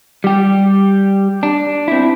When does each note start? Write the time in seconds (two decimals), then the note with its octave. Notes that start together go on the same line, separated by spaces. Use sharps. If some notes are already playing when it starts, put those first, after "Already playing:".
0.24 G3 G4
1.43 D4
1.88 C4 E4